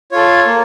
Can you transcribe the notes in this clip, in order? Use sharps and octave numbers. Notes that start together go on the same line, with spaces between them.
F4 A4 C#5
A#3